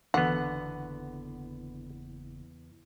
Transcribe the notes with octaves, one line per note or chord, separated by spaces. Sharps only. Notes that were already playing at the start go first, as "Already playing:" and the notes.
F#1 E2 D3 B3 F#4